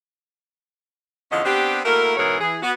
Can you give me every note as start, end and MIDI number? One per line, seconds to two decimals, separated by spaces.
1.31 1.41 40
1.31 1.41 50
1.31 1.41 53
1.31 1.41 61
1.31 1.41 75
1.45 1.80 59
1.45 1.80 60
1.45 1.80 62
1.45 1.80 67
1.85 2.16 57
1.85 2.16 58
1.85 2.16 64
1.85 2.16 66
1.85 2.16 70
2.17 2.36 44
2.17 2.36 47
2.17 2.36 52
2.17 2.36 68
2.17 2.36 70
2.17 2.36 73
2.41 2.58 52
2.41 2.58 68
2.62 2.72 59
2.62 2.72 66